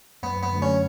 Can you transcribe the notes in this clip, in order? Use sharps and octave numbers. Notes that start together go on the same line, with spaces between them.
F#2 B3
B3
D3 F#3 A3
C#4